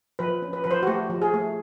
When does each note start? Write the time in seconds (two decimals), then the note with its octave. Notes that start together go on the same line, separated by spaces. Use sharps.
0.19 F3 B4
0.42 C#4
0.53 B4
0.64 F3 B4
0.71 C5
0.83 F#4
0.87 A3 G4
1.10 F3
1.22 G#4
1.34 A3